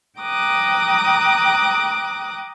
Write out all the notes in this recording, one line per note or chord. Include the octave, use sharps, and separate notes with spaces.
G5 A#5 D6 D#6 F#6